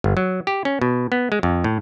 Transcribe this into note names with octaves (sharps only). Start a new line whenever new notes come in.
G1
F#3
G4
C#4
B2
B3
G#3
F2
A2